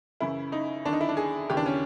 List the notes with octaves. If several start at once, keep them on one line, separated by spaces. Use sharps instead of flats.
F#2 C#3 E3 E4
D#4
D#2 D3 D4
D#4
E4
D4
G#4
D#2 C#3 E3 G4
D4
C#4